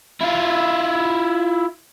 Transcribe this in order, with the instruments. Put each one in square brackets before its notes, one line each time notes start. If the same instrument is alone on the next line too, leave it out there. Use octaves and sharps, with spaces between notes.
[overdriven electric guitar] E4 F4